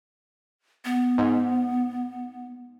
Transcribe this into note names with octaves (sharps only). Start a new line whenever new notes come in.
B3
G#2